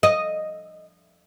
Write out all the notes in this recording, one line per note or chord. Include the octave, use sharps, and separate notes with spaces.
D#5